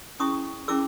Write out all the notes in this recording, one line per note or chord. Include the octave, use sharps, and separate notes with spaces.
C#4 E4 G#4 C#6 D#6
C#4 E4 G#4 D6 E6